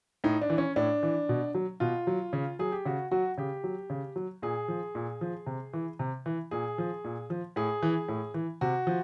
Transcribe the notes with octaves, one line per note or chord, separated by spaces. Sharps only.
A2 D#4
D4
E3
C#4
A2 D4
E3
B2
F#3
B2 F4
F#3
C#3
F#3 G#4
G4
C#3 F#4
F#3 F#4
C#3 G4
F#3
C#3
F#3
A#2 G#4
F3
A#2
F3
C3
E3
C3
E3
A#2 G#4
F3
A#2
F3
A2 G#4
E3
A2
E3
C3 F#4
F3